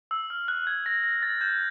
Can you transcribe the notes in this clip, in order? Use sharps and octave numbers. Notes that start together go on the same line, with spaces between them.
E6
F6
F#6
G#6
A#6
A#6
A6
G6